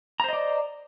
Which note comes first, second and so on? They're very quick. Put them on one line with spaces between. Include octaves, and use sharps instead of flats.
A#5 C5 D#5 D5